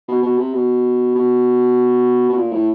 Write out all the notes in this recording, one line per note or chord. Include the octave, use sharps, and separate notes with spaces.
B2
B2
C3
B2
B2
B2
A#2
A2